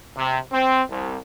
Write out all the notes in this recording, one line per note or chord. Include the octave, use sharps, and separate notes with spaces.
C3
C4
C2